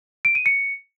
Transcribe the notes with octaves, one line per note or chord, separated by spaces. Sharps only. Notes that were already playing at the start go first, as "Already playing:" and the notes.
D7
D#7
C#7